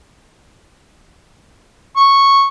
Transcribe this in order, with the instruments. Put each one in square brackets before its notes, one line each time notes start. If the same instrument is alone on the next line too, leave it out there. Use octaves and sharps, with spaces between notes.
[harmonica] C#6